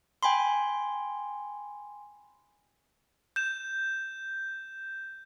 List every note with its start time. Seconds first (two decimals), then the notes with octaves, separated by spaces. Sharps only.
0.23 G5 G#5 B5 C6
3.36 G6 E7